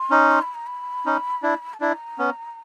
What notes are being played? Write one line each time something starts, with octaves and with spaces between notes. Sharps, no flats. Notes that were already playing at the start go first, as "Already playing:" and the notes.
Already playing: C6
C#4 D#4
C6
B5
A#5
B5
C#4 D#4
D4 E4
A5
D4 E4 A#5
B3 C#4